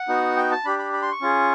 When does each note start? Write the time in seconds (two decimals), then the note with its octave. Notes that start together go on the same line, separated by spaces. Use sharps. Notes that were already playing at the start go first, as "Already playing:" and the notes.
Already playing: F#5
0.08 B3 D#4 F#4
0.36 G5
0.51 A5
0.65 D4 G4 B5
0.79 B5
0.93 B5
1.02 C6
1.11 C#6
1.21 C#4 F4 G#4